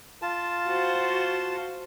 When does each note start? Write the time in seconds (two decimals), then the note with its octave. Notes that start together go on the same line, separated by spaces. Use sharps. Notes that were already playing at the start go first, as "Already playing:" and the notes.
0.22 F4 A5
0.67 F#4 C5